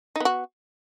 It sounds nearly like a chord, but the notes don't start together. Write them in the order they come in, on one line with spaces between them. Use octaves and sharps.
D#4 B3 F#4